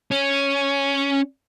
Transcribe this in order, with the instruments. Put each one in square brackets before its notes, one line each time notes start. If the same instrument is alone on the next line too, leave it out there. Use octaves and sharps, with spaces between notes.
[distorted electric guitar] C#4